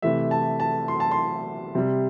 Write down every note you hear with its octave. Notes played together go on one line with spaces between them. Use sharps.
C3 E3 A3 E5
A5
A5
C6
A5
C6
C3 G3